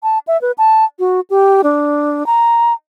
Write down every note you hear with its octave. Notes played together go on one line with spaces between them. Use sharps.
A5
E5
B4
A5
F#4
G4
D4
A#5